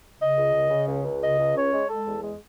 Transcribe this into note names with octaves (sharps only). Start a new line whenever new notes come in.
C#3 D#5
C#2
C#3
C#3
C#2
C#2
C#3 D#5
C#2
C#4 C#5
G#3
G#3 A4
E2
G#3